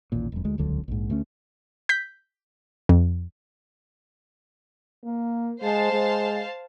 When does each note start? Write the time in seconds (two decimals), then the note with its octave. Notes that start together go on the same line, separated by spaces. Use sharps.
0.12 A1 D#2 A#2
0.32 E1 F#2
0.44 D2 G#3
0.58 D#1 C#2 D3 F#3
0.88 A#1 G#2
1.10 D2 A3 C#4
1.89 G6 B6
2.89 F2
5.05 A#3
5.62 G#3 C5 F5 A5
5.93 G#3